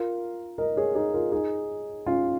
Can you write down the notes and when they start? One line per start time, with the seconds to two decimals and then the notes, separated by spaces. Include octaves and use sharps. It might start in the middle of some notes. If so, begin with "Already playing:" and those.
Already playing: F4 A#4
0.58 A#4 D#5
0.76 G#4 C#5
0.95 D#4 G#4
1.14 F4 A#4
1.32 D#4 G#4
2.06 C#4 F4